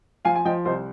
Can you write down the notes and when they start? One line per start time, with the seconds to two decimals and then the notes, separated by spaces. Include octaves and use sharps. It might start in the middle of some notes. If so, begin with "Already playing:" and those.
0.25 F3 F5 G#5
0.36 G#5
0.45 F3 D#5 G5
0.65 C2 C5 D#5